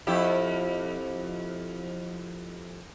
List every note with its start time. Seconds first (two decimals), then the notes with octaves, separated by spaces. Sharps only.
0.07 F2 E4 G4